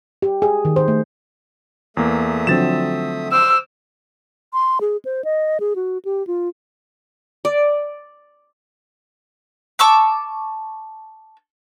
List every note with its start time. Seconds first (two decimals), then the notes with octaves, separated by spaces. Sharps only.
0.22 G4
0.42 G#4
0.65 D#3
0.76 C5
0.88 A3
1.97 E2 A3 A#3 E5 D#6
2.47 D3 F3 F#3 C4 A6 E7
3.32 C5 D6 E6 F6
4.53 C6
4.81 G#4
5.05 C5
5.25 D#5
5.60 G#4
5.76 F#4
6.05 G4
6.27 F4
7.45 D5
9.79 A5 C#6 D6 E6